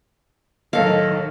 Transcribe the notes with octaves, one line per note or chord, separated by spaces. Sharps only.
B1 A2 D#3 A4 D#5 F5